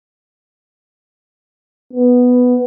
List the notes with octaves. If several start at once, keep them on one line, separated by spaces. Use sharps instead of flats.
B3